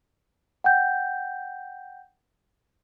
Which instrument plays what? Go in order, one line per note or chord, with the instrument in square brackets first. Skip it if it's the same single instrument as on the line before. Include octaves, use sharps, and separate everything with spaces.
[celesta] F#5 G5 G6